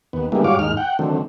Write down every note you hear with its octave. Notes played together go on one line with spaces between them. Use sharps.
D#2 B3
D3 G3 G#3 A#3 B3 E4
G#2 G3 F#4 C#5 F5 D6
D#2 G#2 D#4 F6
F#5 G5
D3 D#3 F#3 A3 C4